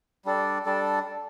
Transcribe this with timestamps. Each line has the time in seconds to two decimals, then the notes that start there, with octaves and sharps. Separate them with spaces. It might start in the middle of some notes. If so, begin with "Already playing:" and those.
0.25 G3 D4 A4 D5
0.66 G3 D4 A4 D5